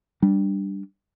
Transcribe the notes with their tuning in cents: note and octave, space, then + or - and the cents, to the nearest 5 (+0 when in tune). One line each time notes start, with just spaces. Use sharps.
G3 +0 D4 +0